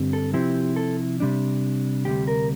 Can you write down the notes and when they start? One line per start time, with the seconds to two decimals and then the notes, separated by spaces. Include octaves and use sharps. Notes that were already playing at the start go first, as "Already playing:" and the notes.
Already playing: G2 D3 G3 C4
0.13 A4
0.34 C3 F3 C4 E4 G4
0.76 A4
1.20 C3 G3 D4
2.05 D2 C3 G3 G4
2.27 A#4